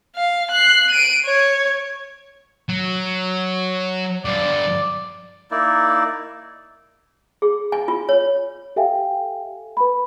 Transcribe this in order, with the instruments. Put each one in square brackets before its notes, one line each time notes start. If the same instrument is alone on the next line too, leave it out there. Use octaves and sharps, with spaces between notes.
[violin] F5
F#6 C7
D7 D#7
C#5
[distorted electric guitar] F#3
[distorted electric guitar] G2 D3 [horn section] D5
[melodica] A#3 D#4 E4 D5
[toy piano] G#4
G#5
F4
C#5
[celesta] G4 A4 E5 F5 G5 G#5
B4 B5